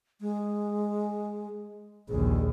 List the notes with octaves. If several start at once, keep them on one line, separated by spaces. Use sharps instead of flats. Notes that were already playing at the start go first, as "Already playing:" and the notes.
G#3
A#1 D#2 G#4